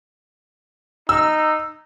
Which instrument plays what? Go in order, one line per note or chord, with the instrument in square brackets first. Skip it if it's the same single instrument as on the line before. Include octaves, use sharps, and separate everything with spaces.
[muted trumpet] D#4 [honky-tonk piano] E6